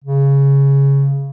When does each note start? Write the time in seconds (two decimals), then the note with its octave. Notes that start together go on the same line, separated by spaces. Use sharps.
0.04 C#3